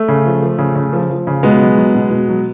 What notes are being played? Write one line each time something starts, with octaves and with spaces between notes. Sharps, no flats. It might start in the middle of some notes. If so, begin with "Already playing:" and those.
Already playing: A3
C#3
F3
F3
C#3
C#3
F3
F3
C#3
B2 G#3 B3
F#3
F#3
B2
B2
F#3